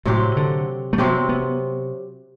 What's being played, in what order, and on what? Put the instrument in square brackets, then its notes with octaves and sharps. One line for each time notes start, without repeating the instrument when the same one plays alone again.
[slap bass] A2 [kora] C3 F#3 C4 G4
[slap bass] D3
A3
[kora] C3 F#3 C4 G4 [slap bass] B3
[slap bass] B3